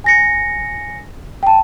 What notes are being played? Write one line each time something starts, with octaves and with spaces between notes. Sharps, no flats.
G#5 A#6 C#7
G5 A5